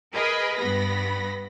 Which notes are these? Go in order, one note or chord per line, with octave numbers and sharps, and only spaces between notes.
G#4 A#4 B4 D#5 B5
G2 B3 B5 A#6